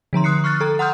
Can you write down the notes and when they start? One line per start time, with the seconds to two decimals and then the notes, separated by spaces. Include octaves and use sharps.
0.13 D3 F3 A#5 C6
0.24 D#6 F#6 C7 C#7
0.44 C#6 F6 F#6 A6
0.61 A4 A#5
0.79 F#5 A#5 C6 D#6 F6 G6